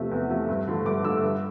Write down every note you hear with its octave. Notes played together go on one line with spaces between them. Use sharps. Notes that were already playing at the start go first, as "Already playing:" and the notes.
Already playing: E2 C3 F3 A3
E2
C3 F3 A3
G2
D3 F3 A3
G2 D6
D3 F3 A3 E6
G2